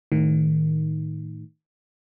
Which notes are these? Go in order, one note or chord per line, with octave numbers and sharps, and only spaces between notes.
A2 D#3